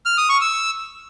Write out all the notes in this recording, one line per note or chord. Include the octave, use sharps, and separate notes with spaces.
F6
D#6
C#6
E6